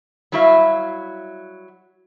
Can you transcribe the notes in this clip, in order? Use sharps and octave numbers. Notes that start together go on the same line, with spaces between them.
F#3 G3 E4 F#4 E5 F5